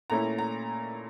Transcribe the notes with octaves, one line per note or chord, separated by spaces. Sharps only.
A#2 A3 C#4 E4 A#5
A#5